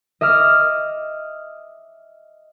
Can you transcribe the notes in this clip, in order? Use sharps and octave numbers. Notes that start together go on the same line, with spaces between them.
D#5 E5 D6 F6